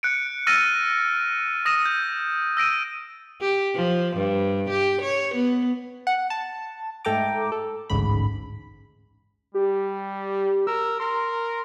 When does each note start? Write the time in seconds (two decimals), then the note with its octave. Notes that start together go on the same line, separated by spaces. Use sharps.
0.03 F#6 C#7 D7
0.47 E6 F6 A6 A#6 D#7
1.65 D#6 A#6 D#7 E7
1.85 G6
2.57 E6 A#6 D7 D#7
3.41 G4
3.75 F3
4.17 G2
4.70 G4
5.02 C#5
5.34 B3
6.07 F#5
6.30 A5
7.05 G#2 A3 A4 G5 A#5 D6
7.52 A4
7.90 A1 D2 G#2 C#3 B5
9.54 G3 G4
10.67 A#4 E6
11.00 A#4 C6